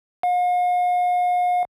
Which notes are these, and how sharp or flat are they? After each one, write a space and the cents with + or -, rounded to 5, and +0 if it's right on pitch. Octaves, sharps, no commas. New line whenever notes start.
F5 +45